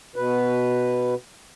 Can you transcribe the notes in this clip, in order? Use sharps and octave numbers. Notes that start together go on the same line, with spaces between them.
B2 B4